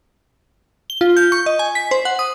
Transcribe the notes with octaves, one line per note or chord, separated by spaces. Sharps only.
G7
F4
G6
C#6
D#5
G#5
B6
C5
F#5
D#6